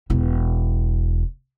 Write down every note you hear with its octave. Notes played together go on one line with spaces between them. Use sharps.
E1 E4